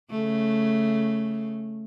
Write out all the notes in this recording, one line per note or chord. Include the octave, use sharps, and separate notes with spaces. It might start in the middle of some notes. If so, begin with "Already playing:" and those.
C#3 A3